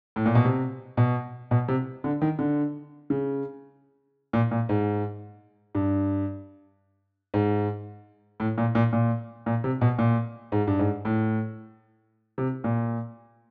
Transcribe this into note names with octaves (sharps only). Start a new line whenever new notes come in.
A2
A#2
B2
C3
B2
B2
C3
D3
D#3
D3
C#3
A#2
A#2
G#2
G2
G#2
A2
A#2
A#2
A#2
A#2
C3
B2
A#2
G#2
G2
G#2
A2
C3
A#2